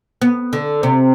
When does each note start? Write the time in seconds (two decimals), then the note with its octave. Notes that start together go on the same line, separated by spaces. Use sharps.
0.22 B3
0.53 D3
0.83 C3